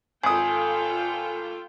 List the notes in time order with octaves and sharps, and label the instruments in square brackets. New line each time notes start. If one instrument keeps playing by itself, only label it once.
[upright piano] G#1 D#6 [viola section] F4 A4 G5 [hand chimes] G#5